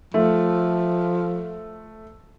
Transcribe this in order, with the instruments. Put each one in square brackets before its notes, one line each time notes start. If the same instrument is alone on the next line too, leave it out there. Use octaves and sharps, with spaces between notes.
[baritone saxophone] F3 [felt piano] A3